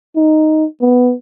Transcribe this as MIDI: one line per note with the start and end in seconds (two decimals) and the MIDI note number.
0.16 0.65 63
0.82 1.13 59